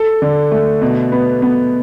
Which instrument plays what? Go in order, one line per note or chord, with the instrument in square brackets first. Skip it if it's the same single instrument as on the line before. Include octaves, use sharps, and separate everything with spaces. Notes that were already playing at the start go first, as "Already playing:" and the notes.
Already playing: [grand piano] A4
D3
A3
B2
B3
B3